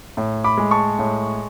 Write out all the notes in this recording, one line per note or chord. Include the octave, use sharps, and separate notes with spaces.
A2
B5 D6
G#3
A5 C#6
A2